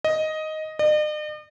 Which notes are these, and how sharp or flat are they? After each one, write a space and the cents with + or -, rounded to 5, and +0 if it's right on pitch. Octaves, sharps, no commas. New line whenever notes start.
D#5 +5
D#5 -45